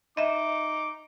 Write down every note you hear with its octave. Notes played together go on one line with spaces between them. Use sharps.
D#4 D#5 E5 D6